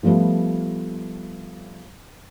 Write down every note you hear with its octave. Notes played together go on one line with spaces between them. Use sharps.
F3 G3 A3 B3 F4